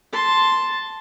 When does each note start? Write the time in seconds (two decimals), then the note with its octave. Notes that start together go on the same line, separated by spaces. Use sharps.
0.13 A5 C6